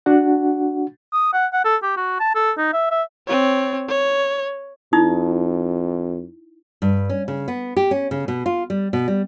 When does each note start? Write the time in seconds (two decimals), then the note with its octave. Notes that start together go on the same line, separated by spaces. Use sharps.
0.06 D4 F#4 F#5
1.13 D#6
1.33 F#5
1.53 F#5
1.65 A4
1.83 G4
1.97 F#4
2.20 A5
2.35 A4
2.58 D#4
2.73 E5
2.91 E5
3.27 C4 C#5
3.89 C#5
4.93 F2 D#4 E4 D#6
6.82 G2
7.10 C#4
7.28 C#3
7.48 B3
7.77 G4
7.91 C#4
8.11 C#3
8.28 B2
8.46 F4
8.70 G3
8.93 B2
9.08 G3